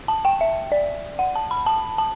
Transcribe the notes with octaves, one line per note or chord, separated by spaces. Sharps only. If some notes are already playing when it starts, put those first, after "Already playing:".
A5
G5
E5
D5
F#5
A5
B5
A5
A5